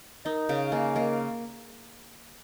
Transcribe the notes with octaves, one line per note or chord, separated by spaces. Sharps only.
D#4 A#4 D#5
C#3 C#5 F5
A#3 D#5 G#5
A#3 A#4 D#5